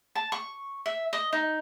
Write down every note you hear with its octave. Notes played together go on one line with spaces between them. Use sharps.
A5
C#6
E5
D#5
D#4